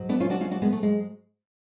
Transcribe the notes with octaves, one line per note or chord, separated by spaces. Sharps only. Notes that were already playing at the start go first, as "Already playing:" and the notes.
Already playing: G#2 F#3
B3 D4
C#4 F4
D4 F#4
C#4 F4
D4 F#4
G#3 B3
A3
G#3